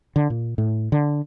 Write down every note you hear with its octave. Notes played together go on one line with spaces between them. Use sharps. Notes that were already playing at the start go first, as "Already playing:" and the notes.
D3
A#2
A2
D3